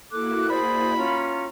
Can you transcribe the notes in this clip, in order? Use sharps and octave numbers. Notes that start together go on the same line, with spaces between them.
A#3 E4 F#4 A4 D6 F#6
G#4 C5 D5 B5
C#4 F4 A#5